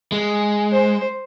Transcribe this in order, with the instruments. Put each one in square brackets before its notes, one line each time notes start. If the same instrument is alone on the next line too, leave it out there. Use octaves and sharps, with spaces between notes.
[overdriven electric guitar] G#3
[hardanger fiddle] C5